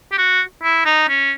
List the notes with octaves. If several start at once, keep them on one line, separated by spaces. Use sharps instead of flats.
G4
F#4
E4
D#4
C#4